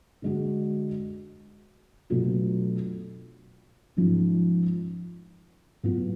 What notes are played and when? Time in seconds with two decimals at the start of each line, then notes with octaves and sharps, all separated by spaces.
0.22 D3 G#3 D4 F#4
2.10 B2 F#3 A3 D4 F4
3.97 G#2 F3 G#3 C#4
5.83 A2 F#3 B3 F4